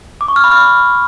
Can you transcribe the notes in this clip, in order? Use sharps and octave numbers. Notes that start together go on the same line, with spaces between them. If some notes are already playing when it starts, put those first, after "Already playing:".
D6
C#6
F6
B5
F6